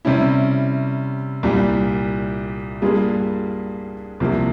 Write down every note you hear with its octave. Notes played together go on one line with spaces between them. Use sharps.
C3 G3 C#4 E4
C2 A#2 G3
G2 G3 A#3 F4 G#4
C2 C3 F3 A#3